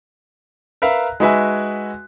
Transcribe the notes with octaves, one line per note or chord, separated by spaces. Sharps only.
A#4 B4 E5 F5 A#5
G#3 D#4 F#4 B4 E5 G#5